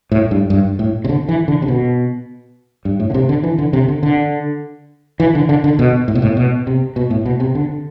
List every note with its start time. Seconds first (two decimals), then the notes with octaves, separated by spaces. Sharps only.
0.12 A2
0.31 G2
0.50 G2
0.79 A2
1.04 C3
1.09 D3
1.29 E3
1.48 D3
1.62 C3
1.68 B2
2.85 G2
3.00 A2
3.10 D3
3.14 C3
3.29 D3
3.44 E3
3.58 D3
3.73 C3
3.88 D3
4.03 D3
5.20 E3
5.35 D3
5.49 D3
5.64 D3
5.79 B2
6.08 A2
6.15 B2
6.22 A2
6.37 B2
6.67 C3
6.96 B2
7.10 A2
7.26 B2
7.40 C3
7.55 D3